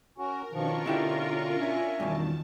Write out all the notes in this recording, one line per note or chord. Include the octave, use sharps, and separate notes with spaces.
C#4 F#4 A#4
B2 D#3 F3 C#4 D4 F4 A#4 C#6
B2 D3 E4 G4
E5 G#5
E2 G2 B2 D#3 A5